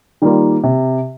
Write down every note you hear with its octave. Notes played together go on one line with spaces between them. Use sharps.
D#3 G3 A#3 F4
C3